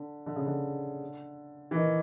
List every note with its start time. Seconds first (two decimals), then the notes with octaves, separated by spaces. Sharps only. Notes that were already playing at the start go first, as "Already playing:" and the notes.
Already playing: D3
0.26 D3
0.36 C#3
0.46 D3
1.71 E3
1.75 D#3